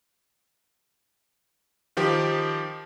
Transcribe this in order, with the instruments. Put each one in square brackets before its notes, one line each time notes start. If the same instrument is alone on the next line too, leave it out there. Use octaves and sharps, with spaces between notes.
[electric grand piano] D#3 F3 G4